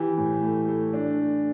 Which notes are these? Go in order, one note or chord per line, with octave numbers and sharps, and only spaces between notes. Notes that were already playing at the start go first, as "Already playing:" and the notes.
Already playing: E3 G4
A2
A3
A3
D4
A3